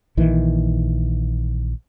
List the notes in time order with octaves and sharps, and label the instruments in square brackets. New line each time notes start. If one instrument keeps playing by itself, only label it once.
[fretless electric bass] A#1 D#3 E3